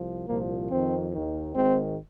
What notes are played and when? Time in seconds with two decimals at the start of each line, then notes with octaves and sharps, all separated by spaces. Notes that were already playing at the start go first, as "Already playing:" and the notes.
Already playing: C2 F3
0.28 C2 A#2 F3 A#3
0.70 F2 D#3 C4
1.12 D#3
1.18 D#2
1.55 G#1 G#2 D#3 C4